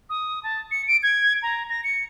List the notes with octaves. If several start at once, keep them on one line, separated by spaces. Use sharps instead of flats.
D#6
A5
C#7
D7
G#6
A#5
A#6
C#7